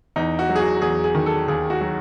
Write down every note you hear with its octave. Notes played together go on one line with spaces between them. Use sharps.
E2 D#4
F#4
F#3
G#4
F#4
E2 G#4
G#4
D#3
A4
D#2 G#4
F#4
F#3